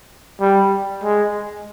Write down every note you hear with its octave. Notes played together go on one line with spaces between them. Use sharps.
G3
G#3